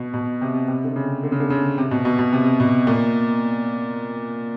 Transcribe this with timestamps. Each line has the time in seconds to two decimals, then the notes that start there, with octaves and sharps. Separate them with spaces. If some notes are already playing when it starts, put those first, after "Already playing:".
Already playing: B2
0.14 B2
0.41 C3
0.68 C3
0.84 D3
0.96 C#3
1.23 D3
1.32 C#3
1.40 D3
1.50 C#3
1.78 C3
1.91 B2
2.05 B2
2.19 B2
2.33 C3
2.60 B2
2.87 A#2